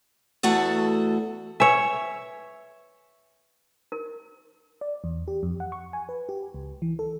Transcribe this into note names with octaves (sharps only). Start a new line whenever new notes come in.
E2 A3 F#4 A4 F#5
B4 C#5 E5 G#5
A#4
D5
E2
G4
F2
F#5
C#6
G#5
B4
G4
C#2
E3
A4